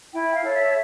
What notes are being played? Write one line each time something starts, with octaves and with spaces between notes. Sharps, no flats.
E4 G5
F5
A4 C#5
E5